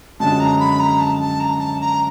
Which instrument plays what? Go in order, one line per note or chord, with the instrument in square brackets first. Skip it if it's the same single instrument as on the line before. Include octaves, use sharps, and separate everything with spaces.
[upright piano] F#2 D3 F3 G#3 [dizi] A5
[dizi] A#5
B5
A#5
A5
A5
A#5
A5
A#5